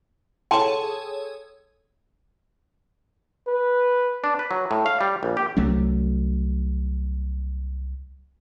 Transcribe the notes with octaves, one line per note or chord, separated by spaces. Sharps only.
G#4 A4 C#5 G5 A5 C6
B4
D4
B4
F#3
A2
F5
G3
A#1
G4
C2 F#3 A3 C#4